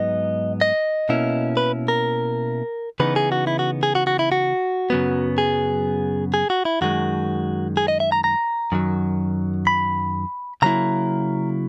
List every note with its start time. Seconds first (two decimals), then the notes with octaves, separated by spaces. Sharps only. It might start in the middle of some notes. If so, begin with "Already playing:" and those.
Already playing: G#2 F#3 B3 D#4 D#5
0.61 D#5
1.09 B2 A#3 C#4 E4
1.57 B4
1.88 A#4
3.00 C#3 E3 B3 D#4 B4
3.16 G#4
3.32 F#4
3.47 E4
3.59 F#4
3.83 G#4
3.95 F#4
4.07 F#4
4.19 E4
4.32 F#4
4.90 F#2 C#3 F#3 B3
5.38 G#4
6.34 G#4
6.50 F#4
6.65 E4
6.81 F#2 D#3 G#3 F#4
7.77 G#4
7.88 D#5
8.00 E5
8.12 A#5
8.24 A#5
8.72 F#2 D#3 F#3
9.67 B5
10.62 C#3 F#3 A#3 E4 A#5